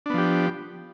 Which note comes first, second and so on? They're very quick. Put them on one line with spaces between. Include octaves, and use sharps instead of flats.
D4 B3 F3 G4